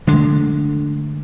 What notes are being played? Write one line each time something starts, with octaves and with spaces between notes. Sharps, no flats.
D3 G#3 A3 D4